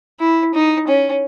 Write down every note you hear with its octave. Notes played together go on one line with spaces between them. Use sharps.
E4
D#4
C#4